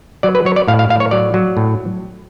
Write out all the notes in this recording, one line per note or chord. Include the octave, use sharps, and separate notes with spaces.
F#3 D5
B4
F#3 C#5
D5
A2 F5
F5
A2 F5
C#5
F#3 D5
F#3
A2